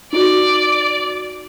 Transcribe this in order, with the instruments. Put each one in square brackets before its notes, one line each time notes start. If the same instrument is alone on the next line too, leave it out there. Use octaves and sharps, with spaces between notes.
[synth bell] D#4 F#4 [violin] D5